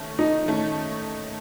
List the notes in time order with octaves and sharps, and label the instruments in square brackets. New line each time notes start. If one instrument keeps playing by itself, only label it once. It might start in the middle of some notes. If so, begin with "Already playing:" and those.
Already playing: [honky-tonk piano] D#3 A3 C#4
[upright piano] D#4
[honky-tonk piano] D#3 A3 C#4